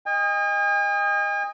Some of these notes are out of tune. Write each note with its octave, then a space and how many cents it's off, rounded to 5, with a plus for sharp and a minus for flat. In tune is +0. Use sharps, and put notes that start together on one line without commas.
D#5 +0 G#5 -45